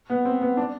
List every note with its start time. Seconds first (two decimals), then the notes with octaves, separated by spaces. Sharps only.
0.10 B3
0.25 C4
0.41 B3
0.57 D4